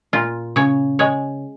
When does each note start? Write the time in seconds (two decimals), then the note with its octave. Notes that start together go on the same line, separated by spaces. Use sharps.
0.13 A#2 F4
0.56 C#3 C#5
0.99 G#3 C#5